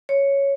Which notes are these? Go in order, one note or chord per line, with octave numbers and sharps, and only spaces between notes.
C#5